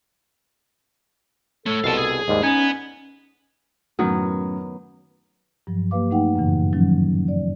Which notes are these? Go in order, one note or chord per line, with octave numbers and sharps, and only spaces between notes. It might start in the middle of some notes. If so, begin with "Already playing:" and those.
A3 A4 C#5
C2 B2 F5 A5
G#4
D#2 G#2 G3 G#3
B3 C#4 D#4 G#5
F#2 A2 D#3 F#3 B3
G2 F3 F#3
A#3 G4 B4 F5 D6
A3 D#4 F#5 G5
F#2 A2 C#3 E3
D#3 F3 F#3 C#4
D5